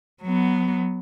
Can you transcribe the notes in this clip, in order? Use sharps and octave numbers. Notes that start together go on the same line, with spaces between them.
F#3 B3